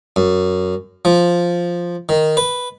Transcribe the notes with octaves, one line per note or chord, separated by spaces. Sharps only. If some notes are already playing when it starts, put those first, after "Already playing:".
F#2
F3
D#3
B4